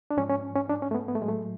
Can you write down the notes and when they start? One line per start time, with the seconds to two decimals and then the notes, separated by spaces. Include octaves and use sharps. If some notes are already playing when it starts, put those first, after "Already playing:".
0.11 D4
0.17 G#2 F3 C#4
0.30 C#4
0.55 C#4
0.69 D4
0.82 C#4
0.91 A3
0.95 B3
1.08 B3
1.15 A3
1.21 A2 F#3 G#3
1.28 A3